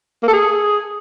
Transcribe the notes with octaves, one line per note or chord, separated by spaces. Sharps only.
A#3
A4
G#4